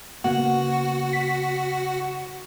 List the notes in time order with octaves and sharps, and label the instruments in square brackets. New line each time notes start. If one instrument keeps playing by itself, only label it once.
[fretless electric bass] C#3 A#3 B3 [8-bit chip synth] F#4 [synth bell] F#5
[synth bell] B6